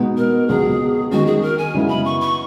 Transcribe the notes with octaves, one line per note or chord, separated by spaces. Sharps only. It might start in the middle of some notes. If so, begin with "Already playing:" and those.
Already playing: B2 G#3 B3 D#4
A#4
C#2 B2 F#3 G#4
D#3 G#3 C#4 F#4
G#4
A#4
G#5
F#2 C#3 G#3 B3 E4
B5
C#6
C#6